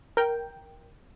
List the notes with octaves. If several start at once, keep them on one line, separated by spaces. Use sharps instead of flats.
A#4 G5